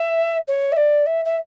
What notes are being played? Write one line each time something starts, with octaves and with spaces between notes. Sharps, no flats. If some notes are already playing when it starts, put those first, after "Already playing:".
Already playing: E5
C#5
E5
D5
E5
E5